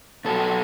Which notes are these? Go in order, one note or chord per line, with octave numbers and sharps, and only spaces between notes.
B2 F#3 A4